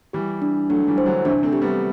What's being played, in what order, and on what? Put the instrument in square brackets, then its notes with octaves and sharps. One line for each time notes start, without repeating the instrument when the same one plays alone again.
[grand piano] E3 G3 [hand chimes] G4
[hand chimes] D4
[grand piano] F#3 A3 [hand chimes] D4
[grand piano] E3 G3
[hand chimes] C5
[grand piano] D3 F#3
[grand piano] C3 E3 [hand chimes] D4
[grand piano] A3 C4
[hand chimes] G4
[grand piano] G3 B3